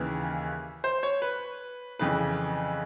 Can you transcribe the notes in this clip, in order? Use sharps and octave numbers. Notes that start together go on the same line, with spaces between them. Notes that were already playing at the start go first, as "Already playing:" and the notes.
Already playing: D#2 C#3 E3
C5
C#5
B4
F2 C#3 E3 B4